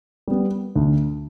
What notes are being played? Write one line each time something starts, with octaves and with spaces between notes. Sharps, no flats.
G3 B3
D2